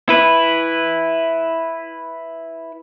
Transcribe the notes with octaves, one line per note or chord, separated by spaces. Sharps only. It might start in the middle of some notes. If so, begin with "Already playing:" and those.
E4 B4